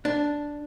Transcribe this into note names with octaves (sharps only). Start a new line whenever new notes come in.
D4